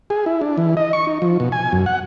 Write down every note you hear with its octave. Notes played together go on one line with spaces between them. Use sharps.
G#4
E4
D4
E3
D#5
C#6
D#4
F3
B2
G#5
F#2
F#5